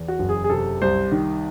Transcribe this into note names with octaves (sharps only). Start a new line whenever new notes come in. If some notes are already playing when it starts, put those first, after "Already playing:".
Already playing: E2
F#4
F#1
G#4
G#4
C3 A4
C2 C5
D#3